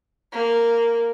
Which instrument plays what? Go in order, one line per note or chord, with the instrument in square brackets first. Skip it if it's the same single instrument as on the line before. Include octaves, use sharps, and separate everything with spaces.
[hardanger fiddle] A#3